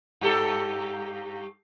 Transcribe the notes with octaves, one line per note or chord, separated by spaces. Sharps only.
G2 G4 A4